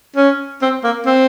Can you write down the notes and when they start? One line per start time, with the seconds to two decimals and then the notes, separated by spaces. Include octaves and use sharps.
0.16 C#4
0.62 C4
0.84 A#3
1.06 C4